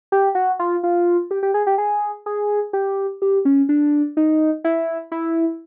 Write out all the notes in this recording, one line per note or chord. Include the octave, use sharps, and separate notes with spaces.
G4
F#4
F4
F4
G4
G4
G#4
G4
G#4
G#4
G4
G4
C#4
D4
D#4
E4
E4